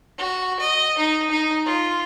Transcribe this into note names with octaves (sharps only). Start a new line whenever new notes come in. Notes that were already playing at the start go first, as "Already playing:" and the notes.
F#4
D#5
D#4
D#4
F4